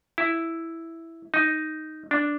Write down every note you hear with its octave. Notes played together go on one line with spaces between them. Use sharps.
E4
D#4
D4